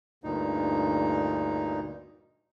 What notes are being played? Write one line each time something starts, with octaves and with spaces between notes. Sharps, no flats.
D2 G2 A#2 D#4